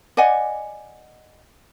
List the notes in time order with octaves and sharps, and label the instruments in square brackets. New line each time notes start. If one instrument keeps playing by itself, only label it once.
[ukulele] D5 D#5 F#5 G#5